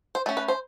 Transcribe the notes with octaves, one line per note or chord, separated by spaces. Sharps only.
C5
A3 C#4
B4
C5